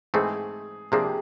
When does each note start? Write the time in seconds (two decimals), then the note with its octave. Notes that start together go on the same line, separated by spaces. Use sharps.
0.14 G#2 E3 A3 C4 G#4
0.92 C3 F3 A#3 D4 G#4
1.03 G4